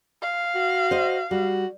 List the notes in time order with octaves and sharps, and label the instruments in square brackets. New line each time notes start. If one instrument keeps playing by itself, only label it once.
[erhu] F5
[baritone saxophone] F#4
[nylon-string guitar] C5 D#5
[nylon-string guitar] G3 [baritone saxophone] F#4